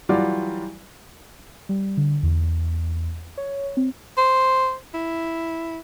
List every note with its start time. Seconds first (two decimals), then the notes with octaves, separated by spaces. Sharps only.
0.09 E3 F#3 G3 F4 F#4 D5
1.69 G3
1.97 D3
2.23 E2
3.37 C#5
3.77 C4
4.18 C5
4.94 E4